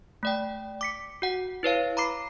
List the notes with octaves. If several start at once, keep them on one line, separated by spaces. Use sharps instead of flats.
A3 D5 G5
D6 B6 C#7
F#4 F#5
E4 B4 C#5 F5
A#5 B5 D6 C7